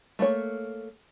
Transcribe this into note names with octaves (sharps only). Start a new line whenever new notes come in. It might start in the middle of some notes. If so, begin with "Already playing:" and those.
A3 A#3 C#5